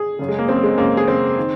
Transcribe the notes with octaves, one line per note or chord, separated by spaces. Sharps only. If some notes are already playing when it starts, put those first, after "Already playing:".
Already playing: G#4
F#2 C#3
G#3
A#3
F#2 C#3 C4
G#3
F#2 C#3 A#3
G#4
F#2 C#3 C4
D#3